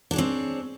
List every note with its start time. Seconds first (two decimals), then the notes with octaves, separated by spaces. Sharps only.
0.11 D4
0.13 G#4
0.16 C#5
0.18 C4